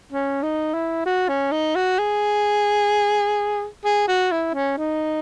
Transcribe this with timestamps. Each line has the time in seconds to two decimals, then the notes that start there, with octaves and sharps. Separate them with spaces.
0.12 C#4
0.43 D#4
0.74 E4
1.06 F#4
1.29 C#4
1.52 D#4
1.76 F#4
1.99 G#4
3.85 G#4
4.08 F#4
4.32 E4
4.54 C#4
4.78 D#4